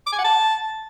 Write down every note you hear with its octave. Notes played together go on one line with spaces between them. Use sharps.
D6
G#5
F#5
A5